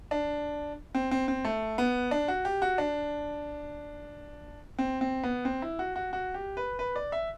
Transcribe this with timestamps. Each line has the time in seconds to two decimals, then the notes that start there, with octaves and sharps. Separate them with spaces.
0.11 D4
0.95 C4
1.11 C4
1.28 C4
1.45 A3
1.78 B3
2.11 D4
2.28 F#4
2.45 G4
2.62 F#4
2.78 D4
4.79 C4
5.01 C4
5.23 B3
5.45 C4
5.62 E4
5.79 F#4
5.96 F#4
6.13 F#4
6.34 G4
6.57 B4
6.79 B4
6.96 D5
7.12 E5